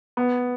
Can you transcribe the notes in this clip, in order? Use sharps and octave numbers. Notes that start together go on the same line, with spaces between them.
B3